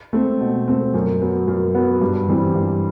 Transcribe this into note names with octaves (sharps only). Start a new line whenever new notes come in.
A3 C4
B2
A3 C4
F#2
F#3 B3
F#2
F#3 B3
G2
E3 G3 C4
G2